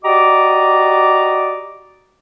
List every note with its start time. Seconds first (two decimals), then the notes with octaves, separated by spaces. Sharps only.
0.04 F#4 G4 D5 D#5 A#5 D6